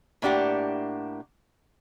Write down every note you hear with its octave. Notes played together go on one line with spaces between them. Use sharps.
A2 A#3 D4 G4 F#5